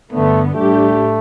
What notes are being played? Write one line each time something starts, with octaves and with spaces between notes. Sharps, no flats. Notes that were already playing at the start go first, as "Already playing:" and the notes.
G2 D3 A3 B3
A2 G3 A3 D4 G4